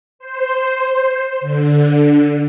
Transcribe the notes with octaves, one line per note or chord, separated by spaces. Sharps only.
C5
D3